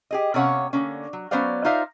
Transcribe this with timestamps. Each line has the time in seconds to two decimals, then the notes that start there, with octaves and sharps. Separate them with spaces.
0.11 G4 G#4 D#5
0.34 C3 B3 C#4 C#5 F5 F#5
0.73 D3 A#3 C#4
1.13 F#3
1.31 F#3 B3 C#4 C5 D5 F5
1.65 D#4 F4 C5 D5 E5 F5